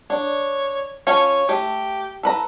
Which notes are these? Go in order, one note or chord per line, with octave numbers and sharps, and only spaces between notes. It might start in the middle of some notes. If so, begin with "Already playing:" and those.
D4 C#5
C#4 F4 C#5 A5
A3 G4
A4 B4 A#5